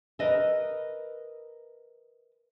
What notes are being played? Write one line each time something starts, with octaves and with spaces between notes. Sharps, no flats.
A#4 B4 D#5 E5